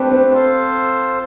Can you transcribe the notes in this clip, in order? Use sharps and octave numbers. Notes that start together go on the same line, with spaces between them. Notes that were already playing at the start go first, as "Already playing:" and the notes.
Already playing: A3 C4 D4 G4 B4
C4
F4 A4 C5